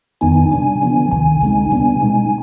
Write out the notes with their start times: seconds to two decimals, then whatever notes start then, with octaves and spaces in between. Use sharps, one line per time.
0.21 F2 D#3 B3 D#4 G#5
0.36 G#5
0.51 C3 G3 D4 G#5
0.82 D3 F3 B3 D4
1.11 D2 C3 D#3 G#5
1.42 D2 D3 G#3 C4 D#4
1.72 C3 G3 B3 D4
2.02 B2 G#3 C4 D#4